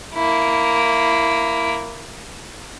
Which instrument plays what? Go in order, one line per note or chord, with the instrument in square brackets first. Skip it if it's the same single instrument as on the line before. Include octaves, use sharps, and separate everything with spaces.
[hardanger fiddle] A#3 E4